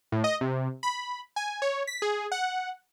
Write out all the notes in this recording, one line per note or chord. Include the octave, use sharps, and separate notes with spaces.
A2
D#5
C3
B5
G#5
C#5
B6
G#4
F#5